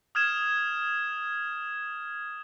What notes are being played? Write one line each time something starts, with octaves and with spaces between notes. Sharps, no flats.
D#6 F6 G#6 E7